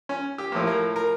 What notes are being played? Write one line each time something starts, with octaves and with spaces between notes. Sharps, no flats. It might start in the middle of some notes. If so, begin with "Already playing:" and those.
C#4
G4
A2 F3 A#3
A#4
A#4